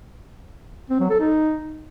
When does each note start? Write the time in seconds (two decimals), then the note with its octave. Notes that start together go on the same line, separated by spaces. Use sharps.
0.90 C4
1.00 F#3
1.10 A4
1.20 D#4